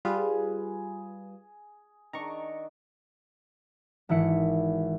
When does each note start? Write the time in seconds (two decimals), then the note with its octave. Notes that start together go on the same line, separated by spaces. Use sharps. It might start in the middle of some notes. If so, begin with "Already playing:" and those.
0.05 G3 F4 G#4 B4
2.13 D#3 D4 A#5 C#6
4.09 G#1 E3 E4 C#7